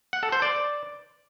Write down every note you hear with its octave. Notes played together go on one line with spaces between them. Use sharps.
F#5
A4
C5
D5